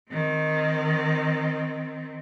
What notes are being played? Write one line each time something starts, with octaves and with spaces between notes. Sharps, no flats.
D#3 C4